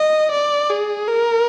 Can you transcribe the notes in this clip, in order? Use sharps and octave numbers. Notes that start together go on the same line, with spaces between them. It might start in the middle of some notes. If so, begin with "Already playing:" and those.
Already playing: D#5
D5
G#4
A#4